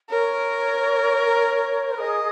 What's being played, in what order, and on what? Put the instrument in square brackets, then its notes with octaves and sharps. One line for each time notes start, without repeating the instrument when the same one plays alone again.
[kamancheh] A#4 [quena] C#5
[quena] G#4 [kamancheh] D#5